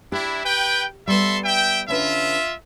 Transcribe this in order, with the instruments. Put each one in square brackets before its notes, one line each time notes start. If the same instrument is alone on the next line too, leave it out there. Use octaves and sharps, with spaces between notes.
[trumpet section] D4 E4 [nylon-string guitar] G4
[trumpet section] B4 G5
[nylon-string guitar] G3 B3 [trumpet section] A4 E5 C6
[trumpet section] E5 G5
[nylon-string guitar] D3 C#4 B4 [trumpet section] F4 E5